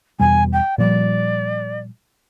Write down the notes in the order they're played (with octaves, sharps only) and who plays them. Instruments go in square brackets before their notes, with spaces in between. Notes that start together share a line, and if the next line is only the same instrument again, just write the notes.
[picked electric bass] E2 B2 G3 [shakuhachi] G#5
[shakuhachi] G5
[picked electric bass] A#2 F3 G3 [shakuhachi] D5